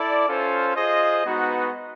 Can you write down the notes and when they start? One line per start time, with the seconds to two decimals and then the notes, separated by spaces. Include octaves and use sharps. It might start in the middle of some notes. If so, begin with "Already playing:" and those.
Already playing: E4 A4 D5
0.28 C#4 F4 A4 C5
0.75 F4 G#4 C5 D#5
1.24 G#3 B3 D#4 F#4 B4